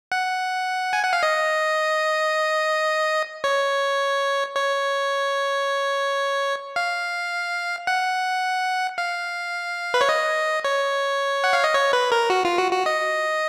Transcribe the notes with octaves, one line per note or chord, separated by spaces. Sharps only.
F#5
G#5
F#5
F5
D#5
C#5
C#5
F5
F#5
F5
B4
C#5
D#5
C#5
F#5
F5
D#5
C#5
B4
A#4
F#4
F4
F#4
F#4
D#5